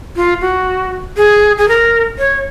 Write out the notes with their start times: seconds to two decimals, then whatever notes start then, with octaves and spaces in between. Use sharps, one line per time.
0.16 F4
0.41 F#4
1.17 G#4
1.58 G#4
1.68 A#4
2.19 C#5